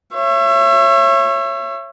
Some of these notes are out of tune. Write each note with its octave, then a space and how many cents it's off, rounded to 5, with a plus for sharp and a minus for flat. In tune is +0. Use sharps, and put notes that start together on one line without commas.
C#5 -20 E5 +30